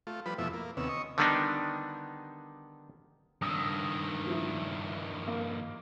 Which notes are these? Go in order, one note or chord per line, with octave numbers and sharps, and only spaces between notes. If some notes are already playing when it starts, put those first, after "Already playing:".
A3 F4
F3 G3 B4 B5
F2 B2 F3 A3 E4 E5
A#3
D#2 C3 B3 C#4 E6
D#5 C#6
D3 D#3 G3 B3 D4 D#4
G2 D#3 D#6 E6
F3 E4
A#3